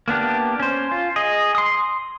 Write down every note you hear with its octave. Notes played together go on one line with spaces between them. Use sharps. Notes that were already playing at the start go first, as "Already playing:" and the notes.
A#3 B3 D4 G4
C#4 C5
F4
G#4 D#5
C6 D#6